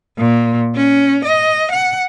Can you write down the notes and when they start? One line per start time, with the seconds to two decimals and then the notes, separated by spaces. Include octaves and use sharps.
0.18 A#2
0.76 C#4
1.25 D#5
1.72 F#5